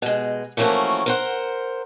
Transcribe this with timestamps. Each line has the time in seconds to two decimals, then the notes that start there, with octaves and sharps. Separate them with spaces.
0.02 B2 G#3
0.57 E3 F3 A3 A#3 C#4 F#4
1.06 A#4 C5 F#5